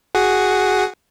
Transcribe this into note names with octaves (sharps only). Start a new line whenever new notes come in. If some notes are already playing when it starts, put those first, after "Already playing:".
F#4 G#4 F#5